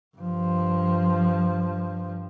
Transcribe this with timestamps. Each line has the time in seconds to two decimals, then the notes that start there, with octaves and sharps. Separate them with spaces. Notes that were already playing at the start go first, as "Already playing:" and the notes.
0.17 G2 F3